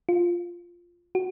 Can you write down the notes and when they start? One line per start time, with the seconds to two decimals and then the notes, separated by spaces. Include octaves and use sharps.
0.09 F4
1.15 F#4